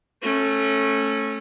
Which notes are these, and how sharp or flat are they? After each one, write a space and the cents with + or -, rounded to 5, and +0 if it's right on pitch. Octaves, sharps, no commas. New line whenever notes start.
A3 +0 C#4 -20